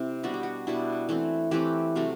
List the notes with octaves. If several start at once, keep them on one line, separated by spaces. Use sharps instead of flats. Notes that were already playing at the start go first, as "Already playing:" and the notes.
Already playing: C3 C4 E4
B2 G3 D4 F#4
G4
F#4
B2 G3 D4 E4
E3 A3 C4
E3 A3 C4 G4 B4
C3 F#3 A3